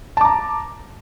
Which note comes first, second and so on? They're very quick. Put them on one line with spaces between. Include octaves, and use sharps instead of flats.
A5 D6 A#5